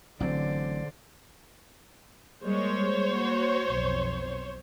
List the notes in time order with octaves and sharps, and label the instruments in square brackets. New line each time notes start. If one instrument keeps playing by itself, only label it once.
[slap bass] A1 F#3 C4 [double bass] D3 [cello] C5 D5
[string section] G3 G#3 A#3 [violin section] C5 C#5
[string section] A#3 F#4
B1 F2 B2